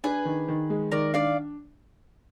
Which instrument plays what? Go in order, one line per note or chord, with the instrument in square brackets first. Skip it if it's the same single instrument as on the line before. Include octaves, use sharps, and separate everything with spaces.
[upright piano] D4 [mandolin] G#4 B4
[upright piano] D#3
D#3
G#3
[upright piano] D#3 [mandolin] A#4 D5
[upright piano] D4 [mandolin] D5 F5